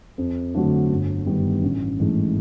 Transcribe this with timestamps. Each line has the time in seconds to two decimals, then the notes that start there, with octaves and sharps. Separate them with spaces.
0.18 F2
0.55 D3 F#3 A3 D4
0.91 G1
1.26 G2 D#3 G3 B3
1.63 A1
1.99 G#2 E3 A3